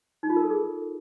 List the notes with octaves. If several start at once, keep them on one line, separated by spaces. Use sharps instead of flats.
D#4
F4
A#4
A4
G#4